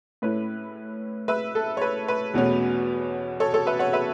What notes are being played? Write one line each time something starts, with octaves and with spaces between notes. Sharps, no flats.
A2 A3 C#4 E4 B4
B4 E5
A4
C#5
B4
B4
E2 B2 A3 C#4
A4 C#5
A4 C#5
B4 E5
C#5 F#5
B4 E5